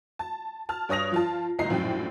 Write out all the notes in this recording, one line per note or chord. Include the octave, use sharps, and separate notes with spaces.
A5
A5 F6
G2 C#5 D#6 A#6 F7
F3 F4 A5
G1 D2 A2 D#5 A#5 C7
A#1 F#2 A2 G5